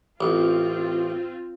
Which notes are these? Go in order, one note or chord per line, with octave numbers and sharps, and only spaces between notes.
A1 C4 F4